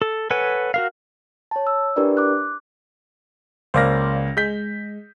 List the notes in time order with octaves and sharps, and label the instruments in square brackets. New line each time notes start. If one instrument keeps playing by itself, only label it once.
[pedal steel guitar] A4
A4 B4 C#5 F#5 G#5
F#4 A#4 F5
[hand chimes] C#5 A5
E6
D4 E4 G4 A#4 B4 D5
D6 F#6
[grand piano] C#2 A#3 A#6 [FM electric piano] C5 D5 F5
[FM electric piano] G#3 [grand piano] G6 B6